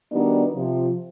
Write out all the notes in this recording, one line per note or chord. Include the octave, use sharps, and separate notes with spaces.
D#3 G3 B3 D4 D#4 F#4
C3 F3